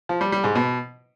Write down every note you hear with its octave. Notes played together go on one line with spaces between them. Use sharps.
F3
G3
G3
G#2
B2